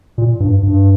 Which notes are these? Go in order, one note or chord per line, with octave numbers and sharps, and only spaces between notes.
A#2
G2
G2